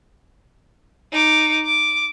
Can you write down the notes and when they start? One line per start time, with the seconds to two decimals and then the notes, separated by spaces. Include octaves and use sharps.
1.12 D#4 D6
1.65 D6